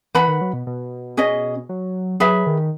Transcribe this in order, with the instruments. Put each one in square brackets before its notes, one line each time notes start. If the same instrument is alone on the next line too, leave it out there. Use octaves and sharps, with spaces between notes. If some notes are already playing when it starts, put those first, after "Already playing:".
[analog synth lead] E3 [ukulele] B4 F#5 B5
[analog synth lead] D#3
F#3
B2
B2
[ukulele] C#4 G#4 D#5
[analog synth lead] F#3
[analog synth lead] F#3 [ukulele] G#4 B4 E5 B5
[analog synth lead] D#3